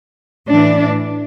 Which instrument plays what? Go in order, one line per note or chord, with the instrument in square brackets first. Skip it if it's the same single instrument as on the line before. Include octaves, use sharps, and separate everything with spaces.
[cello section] A2 E3 D4